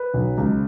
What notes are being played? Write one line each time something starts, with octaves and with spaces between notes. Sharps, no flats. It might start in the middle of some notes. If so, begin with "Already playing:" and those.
Already playing: B4
B1
C#2